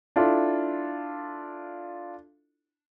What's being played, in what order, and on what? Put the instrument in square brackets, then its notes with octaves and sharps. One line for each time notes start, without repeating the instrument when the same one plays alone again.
[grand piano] D4 E4 F4 A4